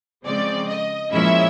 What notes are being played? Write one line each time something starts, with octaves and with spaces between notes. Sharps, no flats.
C#3 F3 G#3 C4 D5
D#5
A#2 F3 G#3 C#4 E4 E5